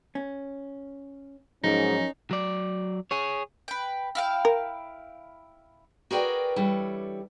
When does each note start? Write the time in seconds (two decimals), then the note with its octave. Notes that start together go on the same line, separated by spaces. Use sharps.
0.15 C#4
1.64 G#2 F3 F#3 C#4 D#4 A#4
2.31 F#3 D5
3.11 G#4 C#5
3.68 B4 G5
4.15 E4 F5 G5
4.45 A#4
6.11 F#4 G#4 A#4 B4 D5 G5
6.56 E3 G3 D4 A4 C#5